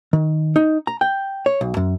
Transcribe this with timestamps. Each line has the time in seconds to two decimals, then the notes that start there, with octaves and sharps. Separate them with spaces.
0.13 D#3
0.56 D#4
0.87 A#5
1.01 G5
1.46 C#5
1.61 B1
1.77 F#2